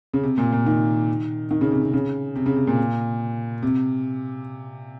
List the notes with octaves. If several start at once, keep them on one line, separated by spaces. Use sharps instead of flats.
C#3
C3
A#2
A#2
D#3
D#3
C#3
C3
C3
C#3
C3
C#3
C3
A#2
C3